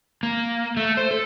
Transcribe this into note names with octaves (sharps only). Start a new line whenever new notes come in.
A#3
A3
C5
A4